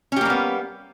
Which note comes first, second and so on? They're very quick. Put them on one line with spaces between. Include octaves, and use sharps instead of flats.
C#4 G4 A#3 G3 B3